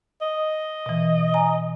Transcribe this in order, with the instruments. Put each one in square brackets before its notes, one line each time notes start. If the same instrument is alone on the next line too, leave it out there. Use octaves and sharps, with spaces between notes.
[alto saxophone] D#5
[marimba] B2 E3
G#5 A#5